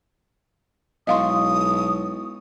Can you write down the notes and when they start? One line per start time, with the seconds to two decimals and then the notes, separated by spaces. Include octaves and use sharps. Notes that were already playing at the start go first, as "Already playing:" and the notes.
1.07 B1 G#3 E4 D#5 F5 C6 C#6 D#6